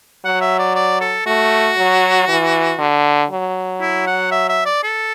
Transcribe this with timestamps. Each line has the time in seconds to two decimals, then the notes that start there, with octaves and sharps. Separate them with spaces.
0.25 F#3 F#5
0.41 E5
0.59 D5
0.76 D5
1.01 A4
1.26 A3 F#4
1.78 F#3
2.28 E3
2.79 D3
3.31 F#3
3.81 E4
4.07 F#5
4.32 E5
4.49 E5
4.66 D5
4.83 A4